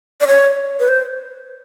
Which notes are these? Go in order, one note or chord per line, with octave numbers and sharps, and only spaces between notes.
D5
C#5
B4
C5